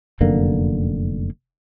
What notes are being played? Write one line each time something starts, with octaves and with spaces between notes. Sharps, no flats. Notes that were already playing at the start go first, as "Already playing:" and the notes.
F1 F#2 D3 A#3